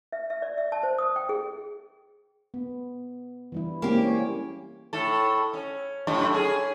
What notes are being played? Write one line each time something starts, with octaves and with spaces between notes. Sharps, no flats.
E5
E5
D5
E5
A5
C5
D#6
G5
G#4
B3
E3 G3 E4
G#3 A#3 C4 C#4 G4
C#4 C#5
A2 A4
C#4
F#2 A2
C#4 G#4